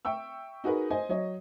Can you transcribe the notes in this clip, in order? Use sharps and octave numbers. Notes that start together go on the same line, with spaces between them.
E5 G5 C#6 E6
D#4 F#4 G#4 A#4 B4
C5 D#5 G#5
F#3 C#5 D#5